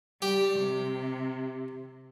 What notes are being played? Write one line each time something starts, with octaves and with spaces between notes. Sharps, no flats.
G3 G4
C3